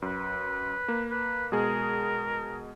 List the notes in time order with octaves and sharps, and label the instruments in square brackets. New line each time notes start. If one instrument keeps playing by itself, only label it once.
[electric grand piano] F#2 [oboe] B4
[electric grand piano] A#3
[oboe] B4
[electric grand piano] B2 G#3 G#4 [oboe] A#4